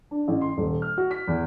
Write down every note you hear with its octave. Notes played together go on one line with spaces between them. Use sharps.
D4
A1
C6
D#1
F6
F#4
B6
E2